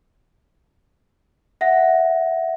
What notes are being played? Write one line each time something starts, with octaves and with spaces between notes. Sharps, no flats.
E5 F#5 A#6